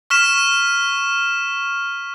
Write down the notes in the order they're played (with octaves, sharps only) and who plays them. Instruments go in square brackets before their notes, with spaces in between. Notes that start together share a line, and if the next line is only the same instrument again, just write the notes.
[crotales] C#6 F6 B6 E7